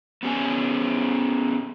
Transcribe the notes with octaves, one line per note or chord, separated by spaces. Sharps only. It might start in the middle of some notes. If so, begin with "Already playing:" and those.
B3 C#4 G#4 A4 B4 G#5